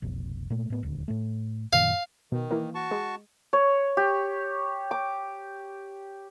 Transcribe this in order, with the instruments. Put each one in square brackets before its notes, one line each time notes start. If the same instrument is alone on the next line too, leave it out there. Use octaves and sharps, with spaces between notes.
[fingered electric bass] F1 B1
A#2 A3
A2 B3
D#1 D2
A2 A3
[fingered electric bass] F#2 A#2 D#3 [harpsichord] F5
[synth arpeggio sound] B2 [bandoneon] D#3
[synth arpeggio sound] E3 A#3
[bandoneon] F#4 A5 C#6
[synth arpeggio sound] G#3
[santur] C#5
G4
D6